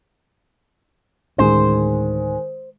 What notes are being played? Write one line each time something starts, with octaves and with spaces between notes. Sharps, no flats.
D2 A2 D#3 G#3 C#4 C5